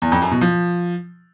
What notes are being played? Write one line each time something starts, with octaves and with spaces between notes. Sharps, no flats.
E2
F2
F#2
B2
F3